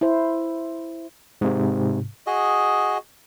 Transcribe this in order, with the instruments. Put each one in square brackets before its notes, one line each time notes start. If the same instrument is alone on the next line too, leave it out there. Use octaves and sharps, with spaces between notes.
[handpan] E4 C5
[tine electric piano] G#2 C3
[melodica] F#4 G#4 D#5